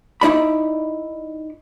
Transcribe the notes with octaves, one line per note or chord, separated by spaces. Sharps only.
D#4 E4 D5 B5